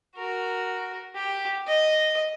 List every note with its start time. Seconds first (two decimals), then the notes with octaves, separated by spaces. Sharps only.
0.16 F#4 A#4
1.15 G4
1.67 D#5